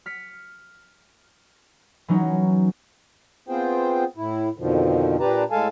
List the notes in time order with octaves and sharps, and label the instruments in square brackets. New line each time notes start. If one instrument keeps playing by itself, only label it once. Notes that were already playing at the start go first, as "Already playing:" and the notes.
[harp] F6 B6 C#7
E3 F#3 C#4 D#4
[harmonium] B3 C4 F4 G#4 C5 G5
A2 E4
F2 B2 D3 D#3 F3
A#2 D4 G4 B4 A5 A#5
A2 G#3 A4 F5 G#5 A5